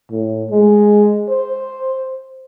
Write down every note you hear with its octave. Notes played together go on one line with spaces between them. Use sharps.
A2
G#3
C5